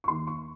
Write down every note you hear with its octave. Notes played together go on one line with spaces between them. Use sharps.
C#6
D#2 D#3 A#3 C6
C#6